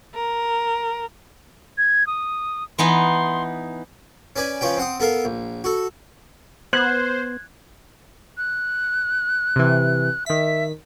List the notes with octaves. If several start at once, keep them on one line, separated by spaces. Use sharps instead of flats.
A#4
G#6
D#6
E3 B3 D#4 C6
C#4 B4 D5 G#5
F3 C#4 B4 G5
C4 F#5 D#6
B3 A4 A#4 F5
A#1
F#4 A4
B3 C5 F#6 G#6
F#6
C3 E3
D#3 E5 B6